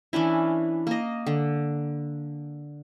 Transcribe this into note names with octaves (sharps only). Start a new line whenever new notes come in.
E3 C#4 D4 E4
A#3 D#5
D3